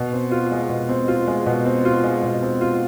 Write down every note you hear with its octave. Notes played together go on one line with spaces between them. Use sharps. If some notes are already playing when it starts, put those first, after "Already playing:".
Already playing: B2
C4
F4
G#3
B2
C4
F4
G#3
B2
C4
F4
G#3
B2
C4
F4